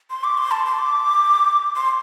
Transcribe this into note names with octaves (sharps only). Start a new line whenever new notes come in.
C6
D6
C6
A5
C6
D6
C6